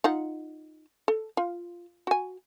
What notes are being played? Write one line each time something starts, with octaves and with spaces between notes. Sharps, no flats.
D#4 F4 F#5
A4
F4
F#4 G#5